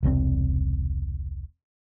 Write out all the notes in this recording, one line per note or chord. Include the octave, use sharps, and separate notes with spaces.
E1 C2 C#3 C4